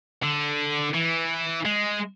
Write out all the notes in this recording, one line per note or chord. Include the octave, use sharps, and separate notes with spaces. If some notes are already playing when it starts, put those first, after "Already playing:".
D3
E3
G#3